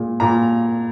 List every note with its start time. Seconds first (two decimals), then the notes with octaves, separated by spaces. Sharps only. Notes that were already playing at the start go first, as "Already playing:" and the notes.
Already playing: A#2 G#3
0.20 A#2 A#5